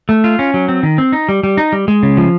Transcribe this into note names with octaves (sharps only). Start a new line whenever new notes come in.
A3
F4
C#4
F#3
C4
D#3
C4
D#4
G3
G3
D#4
G3
G#3
C#3
F3